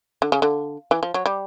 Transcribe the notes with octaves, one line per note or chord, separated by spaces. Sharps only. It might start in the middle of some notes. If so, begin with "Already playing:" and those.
D3
C#3
D3
E3
F3
F#3
G3